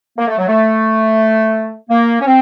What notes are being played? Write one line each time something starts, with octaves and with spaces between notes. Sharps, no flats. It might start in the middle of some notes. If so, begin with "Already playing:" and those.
A#3
A3
F#3
A3
A#3
C#4
C4